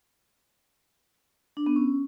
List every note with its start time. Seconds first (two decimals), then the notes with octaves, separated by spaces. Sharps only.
1.57 D4
1.66 B3
1.76 C#4